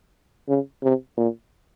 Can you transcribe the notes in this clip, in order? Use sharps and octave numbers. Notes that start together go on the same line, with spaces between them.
C#3
C3
A#2